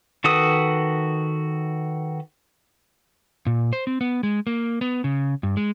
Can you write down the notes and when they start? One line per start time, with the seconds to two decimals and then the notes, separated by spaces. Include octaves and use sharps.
0.24 D#3 F#4 A4 B4 D#6
3.46 A#2
3.73 C5
3.87 C4
4.01 B3
4.23 G#3
4.47 A#3
4.81 B3
5.04 C#3
5.43 G2
5.57 G#3